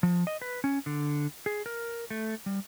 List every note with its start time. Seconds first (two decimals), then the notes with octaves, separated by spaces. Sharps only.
0.03 F3
0.27 D#5
0.42 B4
0.64 C#4
0.86 D3
1.46 G#4
1.66 A#4
2.10 A3
2.46 G3